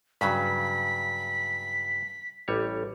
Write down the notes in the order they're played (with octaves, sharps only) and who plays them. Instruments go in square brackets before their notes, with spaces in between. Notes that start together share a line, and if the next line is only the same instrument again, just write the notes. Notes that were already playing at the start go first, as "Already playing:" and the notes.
[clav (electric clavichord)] G2 C#3 F#3 [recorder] B6
[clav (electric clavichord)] A1 G3 C#5